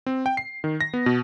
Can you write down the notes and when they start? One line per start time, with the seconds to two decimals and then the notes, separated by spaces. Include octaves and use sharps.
0.06 C4
0.26 G5
0.37 C7
0.64 D#3
0.81 A#6
0.94 B3
1.06 B2